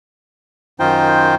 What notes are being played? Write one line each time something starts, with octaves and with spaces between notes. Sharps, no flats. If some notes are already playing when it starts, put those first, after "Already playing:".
F#2 D#3 D#4 F4 C5 G5